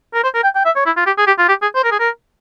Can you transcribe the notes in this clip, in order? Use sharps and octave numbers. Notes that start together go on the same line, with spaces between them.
A#4
C5
A#4
G5
G5
E5
C#5
E4
F4
G4
G#4
G4
F4
G4
G#4
C5
A#4
G#4
A#4